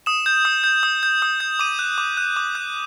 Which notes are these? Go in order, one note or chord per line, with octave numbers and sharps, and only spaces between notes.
D#6 E7
G6
D#6
G6
D#6
G6
D#6
G6
D6 D#7
F#6
D6
F#6
D6
F#6